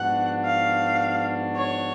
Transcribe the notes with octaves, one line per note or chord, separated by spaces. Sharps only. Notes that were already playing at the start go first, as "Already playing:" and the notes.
Already playing: G#2 F3 B3 D4 F#4 F#5
F5
C#5